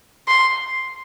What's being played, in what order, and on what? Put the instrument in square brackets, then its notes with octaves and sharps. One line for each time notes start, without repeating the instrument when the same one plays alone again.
[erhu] C6